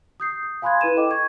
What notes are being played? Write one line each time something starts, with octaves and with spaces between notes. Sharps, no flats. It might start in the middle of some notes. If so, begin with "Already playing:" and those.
D#6 G6 C7
D#6
F5 G#5 B5 C6 F#6 G#6
E4 B4 D#7 E7
A4 D#5 G5 D6
C#6 G#6